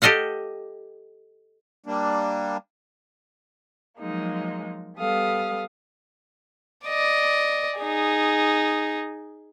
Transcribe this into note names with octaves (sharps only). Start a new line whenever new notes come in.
G4 A4 D#5 F5 F#5
G3 A#3 D4
F3 F#3 G#3 A#3 D#4
G3 B3 A4 F5 D#6
D5 D#5
D#4 G#4